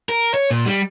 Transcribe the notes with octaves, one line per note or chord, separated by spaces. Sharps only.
A#4
C#5
A#2
G3